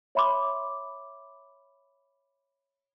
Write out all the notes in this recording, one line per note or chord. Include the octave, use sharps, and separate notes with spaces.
C#5 E5 B5 C6 D6